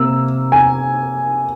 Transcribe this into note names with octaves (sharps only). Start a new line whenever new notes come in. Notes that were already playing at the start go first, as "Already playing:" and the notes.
Already playing: C3 A#3 E6
G#5